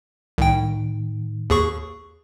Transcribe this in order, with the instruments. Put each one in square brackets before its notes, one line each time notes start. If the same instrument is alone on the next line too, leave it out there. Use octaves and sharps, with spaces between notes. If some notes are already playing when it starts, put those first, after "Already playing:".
[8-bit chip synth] C2 G5 [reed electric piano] A2 D#3
[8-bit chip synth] D#2 G#4 C#6